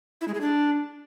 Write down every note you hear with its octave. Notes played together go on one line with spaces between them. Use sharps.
E4
G#3
G#4
D4